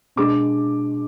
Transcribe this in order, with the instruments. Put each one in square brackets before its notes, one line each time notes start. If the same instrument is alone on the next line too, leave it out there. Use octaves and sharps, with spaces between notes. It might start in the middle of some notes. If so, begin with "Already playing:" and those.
[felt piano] B2 G#3 D4 D6